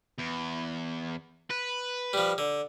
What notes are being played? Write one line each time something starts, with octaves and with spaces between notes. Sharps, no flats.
E2
B4
F3 G3
D3